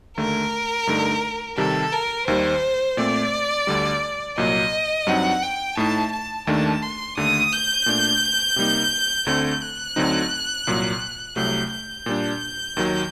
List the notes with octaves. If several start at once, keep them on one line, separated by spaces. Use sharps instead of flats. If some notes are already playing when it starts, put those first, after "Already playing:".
D#2 D3 A3 A#4
G2 D3 A3 D#4
C3 D#3 G3 A4
A#4
D#2 D#3 G3 C5
A#2 A3 C4 D5
D2 D3 G3
C2 A#2 F#3 A#3 D#5
G2 F#3 C4 D#4 F#5
G5
A2 A3 D#4 A5
A5
D#2 D#3 A3 D4 A5
C6
D#2 D3 A3 D#6
G6
A#2 A3 D4
C3 G3 A#3 D#4
D2 D3 A3 C4 G6
F#6
D2 D3 F#3 C4 D#4
C2 A#2 F#3
C2 C3 F#3 A3 G6
G6
A#2 G3 D4
D#2 D#3 F#3